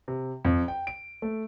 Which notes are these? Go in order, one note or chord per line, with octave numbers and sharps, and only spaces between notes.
C3
F2
G5
D7
A3